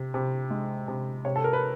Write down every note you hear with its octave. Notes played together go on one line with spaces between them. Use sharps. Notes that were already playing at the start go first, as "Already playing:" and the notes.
Already playing: C3
C3
G#3
C3
C3 C#5
A4
A#4
B4